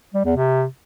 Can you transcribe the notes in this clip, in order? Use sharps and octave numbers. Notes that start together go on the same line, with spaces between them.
G3
E2
C3